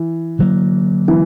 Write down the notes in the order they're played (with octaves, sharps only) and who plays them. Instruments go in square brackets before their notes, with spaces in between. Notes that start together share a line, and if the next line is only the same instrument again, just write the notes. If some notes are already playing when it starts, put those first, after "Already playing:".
Already playing: [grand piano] E3
[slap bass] D3 F#3 A#3
[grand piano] E3